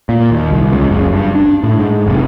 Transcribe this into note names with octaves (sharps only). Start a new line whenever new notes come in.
A#2
D#2
C2
C#2
F#1
G2
D4
A2
G#2
F1